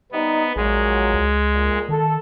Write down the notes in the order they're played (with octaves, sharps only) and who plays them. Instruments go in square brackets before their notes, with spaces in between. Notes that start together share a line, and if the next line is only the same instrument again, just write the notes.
[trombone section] C3 G3 D#4 [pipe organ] B3
[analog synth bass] A#1 [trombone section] A#2 F#3 [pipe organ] G#3
[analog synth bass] C#2
[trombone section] A#2
[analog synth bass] D#3 [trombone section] A4